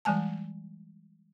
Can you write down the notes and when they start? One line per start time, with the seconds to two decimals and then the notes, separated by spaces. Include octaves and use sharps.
0.05 E3 G3 G#3 G#5 A5